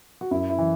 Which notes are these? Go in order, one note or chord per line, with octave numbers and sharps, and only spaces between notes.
F#4
F#2 E4
E4
E3